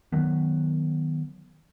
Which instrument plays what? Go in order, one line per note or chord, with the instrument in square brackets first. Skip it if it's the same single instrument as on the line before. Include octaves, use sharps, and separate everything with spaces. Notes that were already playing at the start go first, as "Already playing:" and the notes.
[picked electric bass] D#3 F#3 B3